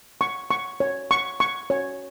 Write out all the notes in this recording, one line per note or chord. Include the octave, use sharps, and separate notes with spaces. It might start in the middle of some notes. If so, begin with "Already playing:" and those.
C#6
C#6
C#5
C#6
C#6
C#5